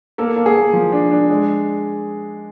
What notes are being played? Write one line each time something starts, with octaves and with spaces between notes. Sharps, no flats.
A#3 A4
A#3
G#4
A#3
F3
D4
D4
G#3